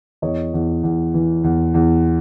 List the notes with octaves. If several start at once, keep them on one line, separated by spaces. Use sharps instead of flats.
E2 C#5 D#5
E2
E2
E3
E2
E2